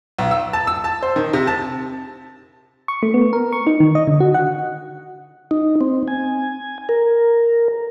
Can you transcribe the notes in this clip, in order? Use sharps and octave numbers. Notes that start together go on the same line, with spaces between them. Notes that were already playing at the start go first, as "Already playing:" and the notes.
B1
E6
A5
E6
A5
C5
D#3
C3
A5
C#6
A3
B3
A#4
C#6
D#4
D#3
D#5
D3
F#4
F#5
D#4
C4
G#5
A#4